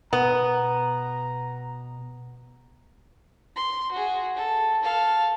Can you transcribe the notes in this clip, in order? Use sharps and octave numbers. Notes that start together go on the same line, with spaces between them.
B2 B3 A#5
C6
F#4 G#4
A4
A4 F5